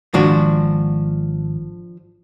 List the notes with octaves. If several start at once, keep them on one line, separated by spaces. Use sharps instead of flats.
G#1 D#3 F3 G#3 D4 F#4